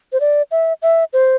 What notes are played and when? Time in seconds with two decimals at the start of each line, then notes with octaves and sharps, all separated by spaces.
0.12 C5
0.20 D5
0.51 E5
0.82 E5
1.13 C5